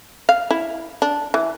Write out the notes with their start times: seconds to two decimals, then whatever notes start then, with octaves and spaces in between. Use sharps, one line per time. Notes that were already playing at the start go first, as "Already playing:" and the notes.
0.29 F5
0.51 E4
1.02 D4
1.34 E3